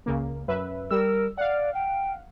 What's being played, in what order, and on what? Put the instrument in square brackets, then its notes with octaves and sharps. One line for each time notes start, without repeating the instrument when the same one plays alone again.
[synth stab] C#2 C#3 A#3
F#2 B4 E5
[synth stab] G3 E6 [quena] A#4
[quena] D5 [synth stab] F5 F#5
[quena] G5